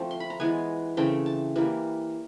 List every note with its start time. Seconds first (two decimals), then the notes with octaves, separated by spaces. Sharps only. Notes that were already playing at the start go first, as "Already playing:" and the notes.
Already playing: F3 A3 C4
0.11 C6
0.20 B5
0.30 A#5
0.40 E3 G#3 B3 G#5
0.97 C#3 E3 A3 C4 G5
1.26 A5
1.56 E3 G3 A#3